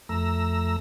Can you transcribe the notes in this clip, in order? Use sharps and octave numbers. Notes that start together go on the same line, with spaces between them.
F2 A3 A#5 E6